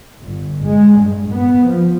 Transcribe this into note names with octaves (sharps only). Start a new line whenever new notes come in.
G1
G#3
G2
B3
F3